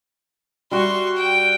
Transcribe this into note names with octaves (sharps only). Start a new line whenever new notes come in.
G3 F#4 C6 C#6
G5